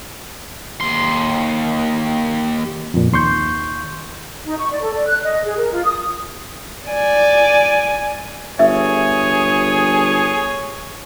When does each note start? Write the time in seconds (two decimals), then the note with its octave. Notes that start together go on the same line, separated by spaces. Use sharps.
0.81 D#2 C6
2.94 F2 A#2
3.13 D#2 C6 C#6 G6
4.46 D#4
4.58 C#6
4.70 D5
4.82 A4
4.94 D5
5.06 F#6
5.24 D#5
5.44 G#4
5.57 A#4
5.72 F4
5.85 D#6
6.89 D5 G#5
8.59 G1 G#4 C#5 E5